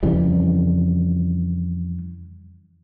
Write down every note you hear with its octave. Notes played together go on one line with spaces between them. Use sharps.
F2 C#3 E3 G3